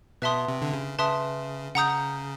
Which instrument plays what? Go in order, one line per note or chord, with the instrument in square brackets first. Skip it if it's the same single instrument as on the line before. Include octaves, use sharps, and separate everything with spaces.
[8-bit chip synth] B2 [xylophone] B4 E5 A5 C6 D#6
[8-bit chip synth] C3
D3
C#3
[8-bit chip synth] C#3 [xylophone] B4 E5 A5 C6 D#6
[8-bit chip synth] C#3 [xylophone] F#5 A#5 D#6 G6